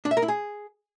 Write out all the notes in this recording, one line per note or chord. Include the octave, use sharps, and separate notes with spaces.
D4
E5
A#4
E4
G#4